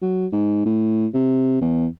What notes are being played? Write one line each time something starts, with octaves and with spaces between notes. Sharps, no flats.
F#3
G#2
A2
C3
E2